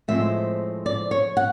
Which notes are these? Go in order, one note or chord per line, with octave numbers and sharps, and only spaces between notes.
A2 F3 G#3 C4 E5
D5
C#5
F#5